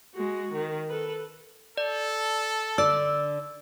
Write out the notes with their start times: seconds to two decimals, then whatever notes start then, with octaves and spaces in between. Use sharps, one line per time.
0.14 G#3 F#4
0.52 D#3
0.89 A4 B4
1.77 A4 D5
2.78 D3 D5 E6